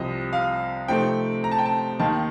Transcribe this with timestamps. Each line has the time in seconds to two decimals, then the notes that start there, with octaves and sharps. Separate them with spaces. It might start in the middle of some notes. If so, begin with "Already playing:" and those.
Already playing: C2 C3 F3 D#5
0.33 F5
0.88 C3 F3 A3 C4 D#4 G5
1.44 A#5
1.52 A5
1.58 G5
1.66 A5
2.00 D#2 D#3 A#3 D#4 A5